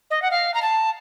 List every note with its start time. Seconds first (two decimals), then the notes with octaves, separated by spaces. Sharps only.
0.11 D#5
0.22 F#5
0.31 F5
0.54 A#5
0.62 A5